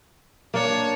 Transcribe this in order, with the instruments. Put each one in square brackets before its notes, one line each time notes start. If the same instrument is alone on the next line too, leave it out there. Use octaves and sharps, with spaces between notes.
[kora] A#3 D4 [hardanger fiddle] C#5